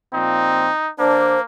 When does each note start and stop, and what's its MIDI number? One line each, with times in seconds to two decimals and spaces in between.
0.13 0.70 46
0.13 0.70 53
0.13 0.70 60
0.13 0.90 63
0.99 1.37 50
0.99 1.43 58
0.99 1.37 62
0.99 1.40 72